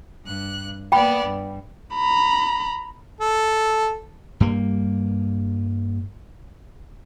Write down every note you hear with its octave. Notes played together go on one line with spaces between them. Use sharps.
G2 F#6
A#3 B3 D5 G5 B5
G2
A#5 B5
A4
G2 G3 A#3